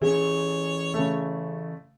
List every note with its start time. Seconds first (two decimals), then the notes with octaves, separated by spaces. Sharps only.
0.02 E3 C4 C#4 G#4 C#5
0.94 C#3 A3